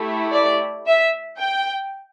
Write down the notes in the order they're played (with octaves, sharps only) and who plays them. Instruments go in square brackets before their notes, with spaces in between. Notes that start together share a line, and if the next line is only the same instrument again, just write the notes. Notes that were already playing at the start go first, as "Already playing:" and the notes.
Already playing: [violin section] A3 E4 G4
D5
E5
G5